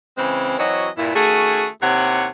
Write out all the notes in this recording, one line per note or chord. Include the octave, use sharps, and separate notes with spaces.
C#3 E3 G#3 C4
E3 F#3 C4 F#4 C#5 D#5
G2 A#2 E4
D#3 A3 C#4 F#4 G#4
D#2 C3 E4 C#5 F#5